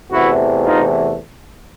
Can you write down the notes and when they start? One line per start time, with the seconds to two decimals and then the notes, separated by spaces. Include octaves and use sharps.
0.12 E2 C3 E3 A3 E4 F#4
0.64 D#4 F4